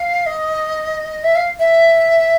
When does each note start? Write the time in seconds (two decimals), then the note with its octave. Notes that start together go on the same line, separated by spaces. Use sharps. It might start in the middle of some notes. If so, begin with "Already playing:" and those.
Already playing: F5
0.26 D#5
1.24 E5
1.35 F5
1.59 E5